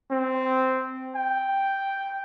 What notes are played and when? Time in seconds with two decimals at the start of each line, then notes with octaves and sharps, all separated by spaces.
0.11 C4
1.15 G5